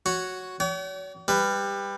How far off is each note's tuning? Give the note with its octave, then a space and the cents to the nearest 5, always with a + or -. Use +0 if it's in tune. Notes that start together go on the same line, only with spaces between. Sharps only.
F#4 +0 C#5 +0
C#5 +45 G5 -45
G3 +20 B4 +10